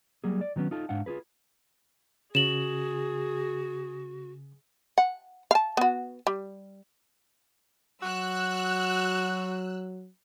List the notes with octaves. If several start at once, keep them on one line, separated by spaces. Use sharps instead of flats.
F#3 G3 A#3 G#4
D5
D#3 F#3 B3 C#4
D#4 F4 A4
G#2 D4 F5 F#5
F4 G4 G#4 B4
C#3 F#4 G#4 E7 F#7
F#5
F5 A5
B3 F#4
G3
F#3 F#4 E6 F#6